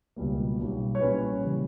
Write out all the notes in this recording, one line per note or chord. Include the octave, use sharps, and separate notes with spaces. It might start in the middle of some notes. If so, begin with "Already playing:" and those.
C#2 B2 G3 A#3
B1 B2 G3
C#5
A#2 G3 C#4 E4 B4
C#3 E3 G3 A#3